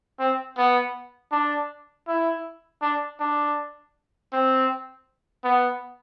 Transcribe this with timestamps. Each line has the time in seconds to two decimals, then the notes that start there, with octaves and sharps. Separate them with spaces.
0.19 C4
0.57 B3
1.32 D4
2.08 E4
2.82 D4
3.20 D4
4.33 C4
5.44 B3